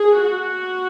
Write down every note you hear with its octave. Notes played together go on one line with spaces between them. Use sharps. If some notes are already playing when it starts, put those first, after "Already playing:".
Already playing: G#4
F#4